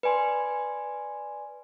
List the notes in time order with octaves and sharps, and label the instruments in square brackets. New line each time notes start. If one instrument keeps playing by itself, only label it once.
[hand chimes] B4 D5 G#5 C6